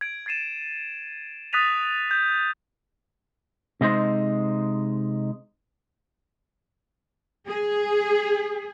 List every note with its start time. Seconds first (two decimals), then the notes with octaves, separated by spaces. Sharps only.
0.01 G#6 D7
0.26 G#6 A6 C7 D#7 E7
1.53 D#6 F#6 A6 B6 D#7 F7
2.11 G6
3.81 C3 G#3 D#4 C5
7.47 G#4